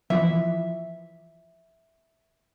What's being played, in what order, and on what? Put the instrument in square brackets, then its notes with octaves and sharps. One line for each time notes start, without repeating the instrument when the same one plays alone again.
[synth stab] E3 F3 [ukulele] E5